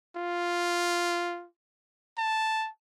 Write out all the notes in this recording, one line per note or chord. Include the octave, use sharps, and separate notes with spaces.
F4
A5